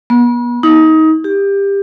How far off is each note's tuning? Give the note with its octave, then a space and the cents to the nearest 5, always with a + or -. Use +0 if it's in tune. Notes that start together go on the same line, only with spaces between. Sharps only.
B3 -40
D#4 +25
G4 +20